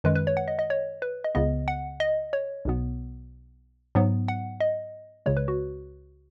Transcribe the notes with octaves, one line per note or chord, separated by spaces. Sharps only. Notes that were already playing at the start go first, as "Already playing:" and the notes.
F#2 D#3 G#3 B4
B4
C#5
F#5
D#5
D#5
C#5
B4
D#5
C#2 C#3 B3 D#5
F#5
D#5
C#5
B1 B2 B3
G#2 F#3 B3
F#5
D#5
C#2 C#3 G#3 C#5
B4
F#4